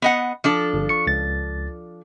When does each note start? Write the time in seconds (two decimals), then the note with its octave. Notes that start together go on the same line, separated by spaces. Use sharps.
0.02 B3 D#5 F#5
0.44 F3 D4 A4
0.74 G1
0.89 C#6 C#7
1.07 C#2 A6